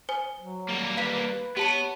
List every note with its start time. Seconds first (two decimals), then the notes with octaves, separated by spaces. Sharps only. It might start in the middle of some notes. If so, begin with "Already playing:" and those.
0.09 C5 G#5
0.38 F#3
0.69 G3 A#3
0.97 B4 F5 B6
1.57 B3 G4 C#5 A5 C#7